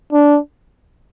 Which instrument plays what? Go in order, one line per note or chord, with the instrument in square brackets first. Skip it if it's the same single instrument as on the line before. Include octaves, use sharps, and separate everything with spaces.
[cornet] D4